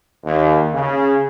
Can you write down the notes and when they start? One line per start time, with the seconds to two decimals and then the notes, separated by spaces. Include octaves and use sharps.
0.25 D#2
0.73 C#3